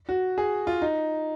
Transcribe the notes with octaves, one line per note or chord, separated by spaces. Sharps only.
F#4
G#4
F4
D#4